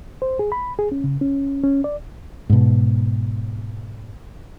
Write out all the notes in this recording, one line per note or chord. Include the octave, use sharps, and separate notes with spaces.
C5
G#4
B5
G#4
C#4
C#3
C#4
C#4
D5
G#2 B2